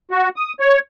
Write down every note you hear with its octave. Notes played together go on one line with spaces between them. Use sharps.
F#4
D#6
C#5